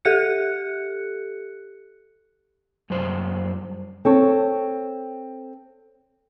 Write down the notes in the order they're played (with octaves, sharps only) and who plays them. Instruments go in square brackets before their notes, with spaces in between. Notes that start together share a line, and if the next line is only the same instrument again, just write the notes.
[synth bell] G4 A4 F#6 C#7
[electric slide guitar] F#2 G3 F4 C5
[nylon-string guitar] C4 A4 C#5